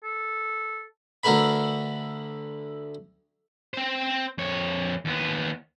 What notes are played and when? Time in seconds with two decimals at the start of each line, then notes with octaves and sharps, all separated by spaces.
0.04 A4
1.24 D2 D3 A#4 B4 B5
3.74 C4 C5
4.38 F2 C#5
5.05 D#2 B3